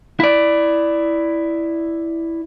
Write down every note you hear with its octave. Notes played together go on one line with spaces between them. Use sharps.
E4 D5